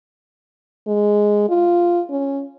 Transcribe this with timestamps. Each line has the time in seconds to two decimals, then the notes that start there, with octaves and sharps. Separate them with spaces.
0.87 G#3
1.49 F4
2.10 C#4